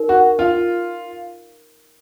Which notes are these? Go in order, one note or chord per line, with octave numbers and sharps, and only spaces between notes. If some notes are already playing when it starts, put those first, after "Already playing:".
Already playing: D#4 A#4
F#4
F4